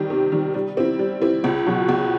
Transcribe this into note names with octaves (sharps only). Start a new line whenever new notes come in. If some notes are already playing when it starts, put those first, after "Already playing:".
Already playing: C3 D#3 G3
C3
D#3 G3
G3
C4 E4
G3
C4 E4
C#2
B2 F#3
C#2